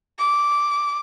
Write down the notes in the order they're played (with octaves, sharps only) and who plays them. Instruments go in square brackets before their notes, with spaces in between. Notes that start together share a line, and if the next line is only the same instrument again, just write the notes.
[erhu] D6